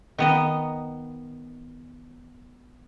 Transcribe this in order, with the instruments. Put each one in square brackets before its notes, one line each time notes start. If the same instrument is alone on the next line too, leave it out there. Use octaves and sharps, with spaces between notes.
[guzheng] D#3 B3 D#5